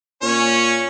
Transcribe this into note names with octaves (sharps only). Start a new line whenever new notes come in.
A#2 C#4 C#5